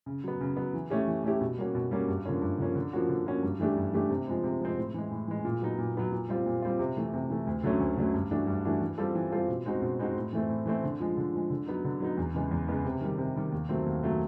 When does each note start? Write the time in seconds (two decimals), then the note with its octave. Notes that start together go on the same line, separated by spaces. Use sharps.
0.06 C#3
0.24 F#3 B3
0.41 C#3
0.57 F#3 B3
0.74 E3
0.90 A3 C#4 E4 G4
1.08 E3
1.24 A3 C#4 E4 G4
1.41 B2
1.58 G3 A#3 C#4 F#4
1.75 B2
1.91 G3 A#3 C#4 F#4
2.08 G2
2.25 D3 F3 A#3 C#4
2.42 G2
2.58 D3 F3 A#3 C#4
2.75 D3
2.93 F3 A#3 C#4 F#4
3.09 D3
3.26 F3 A#3 C#4 F#4
3.43 G2
3.60 E3 A3 D4 G4
3.77 G2
3.93 E3 A3 D4 G4
4.10 C3
4.27 F3 G#3 C4
4.44 C3
4.60 F3 G#3 C4
4.77 A2
4.94 E3 G#3
5.11 A2
5.28 E3 G#3
5.45 A#2
5.61 F#3 B3 D#4
5.78 A#2
5.95 F#3 B3 D#4
6.12 A#2
6.29 G3 C4 F4
6.46 A#2
6.62 G3 C4 F4
6.79 C3
6.97 E3 A3
7.14 C3
7.30 E3 A3
7.47 D2
7.63 D3 F#3 A3 C#4
7.80 D2
7.97 D3 F#3 A3 C#4
8.14 G2
8.31 E3 A3 D4 F#4
8.47 G2
8.65 E3 A3 D4 F#4
8.81 E3
8.98 G3 C4 F4 A4
9.15 E3
9.32 G3 C4 F4 A4
9.48 B2
9.66 G#3 C4 D#4 F#4
9.82 B2
9.99 G#3 C4 D#4 F#4
10.16 A2
10.33 E3 A3 C4
10.49 A2
10.66 E3 A3 C4
10.83 D3
11.00 F3 G#3
11.17 D3
11.33 F3 G#3
11.50 D3
11.67 F#3 B3 D#4
11.84 D3
12.00 F#3 B3 D#4
12.17 E2
12.34 C#3 E3 G#3 B3
12.51 E2
12.68 C#3 E3 G#3 B3
12.85 C3
13.01 D#3 G3
13.18 C3
13.36 D#3 G3
13.52 D#2
13.69 D#3 F#3 A3 C4
13.86 D#2
14.02 D#3 F#3 A3 C4